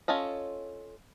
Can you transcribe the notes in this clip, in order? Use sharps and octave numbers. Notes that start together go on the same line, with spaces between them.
C#4 F4 A4 D#5